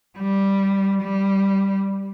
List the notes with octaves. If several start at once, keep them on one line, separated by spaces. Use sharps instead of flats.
G3
G3